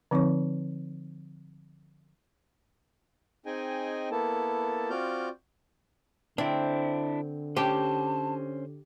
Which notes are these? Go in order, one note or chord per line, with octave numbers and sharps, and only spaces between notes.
D3 F3 C4 D#4 C#5 C#6
C4 D#4 G#4 D#5 G5 G#5
A#3 B3 E4 A4 A5
C4 F4 F#4 D5 F6 G6
D3 C4 D4 E4
C#4 G4 C5 A5